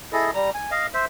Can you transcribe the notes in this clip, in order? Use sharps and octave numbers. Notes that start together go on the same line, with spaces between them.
E4 G#4 A4 D#5
G3 A#5
G#5
D#5 F5
C5 E5